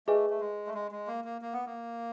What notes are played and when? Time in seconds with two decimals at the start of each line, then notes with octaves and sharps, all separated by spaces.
0.07 A3 G#4 B4 D#5 G#5
0.30 A3
0.40 G#3
0.67 A3
0.74 G#3
0.91 G#3
1.07 A#3
1.24 A#3
1.42 A#3
1.53 B3
1.66 A#3